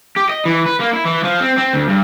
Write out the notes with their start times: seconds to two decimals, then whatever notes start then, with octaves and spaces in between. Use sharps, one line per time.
0.16 G4
0.29 D#5
0.45 E3
0.66 B4
0.80 A#3
0.93 E4
1.05 E3
1.24 F3
1.40 C4
1.57 C4
1.73 D2
1.89 G2